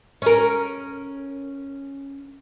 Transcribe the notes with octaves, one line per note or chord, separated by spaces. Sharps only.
C#4 A#4